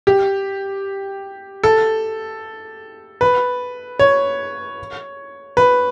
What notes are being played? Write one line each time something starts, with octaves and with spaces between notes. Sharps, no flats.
G4
A4
B4
C#5
B4